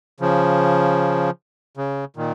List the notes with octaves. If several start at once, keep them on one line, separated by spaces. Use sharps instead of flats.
C#3 F3
C#3
A#2 D#3